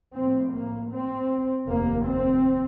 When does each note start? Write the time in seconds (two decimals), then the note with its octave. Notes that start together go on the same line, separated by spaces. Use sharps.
0.14 A#1 A2 C4
0.52 A#3
0.91 C4
1.67 F1 D#2 A#3
2.06 C4